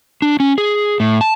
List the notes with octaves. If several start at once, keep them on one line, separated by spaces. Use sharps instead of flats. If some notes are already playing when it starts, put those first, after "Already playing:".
D4
C#4
G#4
A2
A5